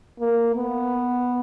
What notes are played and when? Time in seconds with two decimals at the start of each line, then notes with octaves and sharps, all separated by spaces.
0.20 A#3
0.55 B3